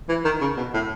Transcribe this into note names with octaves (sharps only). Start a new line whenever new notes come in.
E3
D#3
C#3
B2
A2